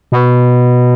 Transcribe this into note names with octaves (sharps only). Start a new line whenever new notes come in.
B2